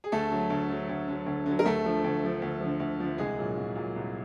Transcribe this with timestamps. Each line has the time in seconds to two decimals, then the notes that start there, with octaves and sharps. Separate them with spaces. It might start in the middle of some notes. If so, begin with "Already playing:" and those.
0.04 G#4
0.12 D2 A3 A4
0.31 D3 F#3
0.50 D2
0.70 D3 F#3
0.89 D2
1.08 D3 F#3
1.26 D2
1.46 D3 F#3
1.59 A#4
1.65 D2 A3 A4
1.84 D3 F3
2.04 D2
2.23 D3 F3
2.42 D2
2.61 D3 F3
2.80 D2
3.00 D3 F3
3.18 C2 G#3 G#4
3.38 A#2 F#3
3.57 C2
3.75 A#2 F#3
3.96 C2